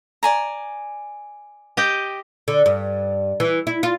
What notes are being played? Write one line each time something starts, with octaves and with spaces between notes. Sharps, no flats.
D5 G#5 A#5
G4 D#5 G5
D3
G2
E3
E4
F4